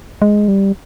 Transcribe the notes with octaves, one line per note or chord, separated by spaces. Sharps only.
G#3
G3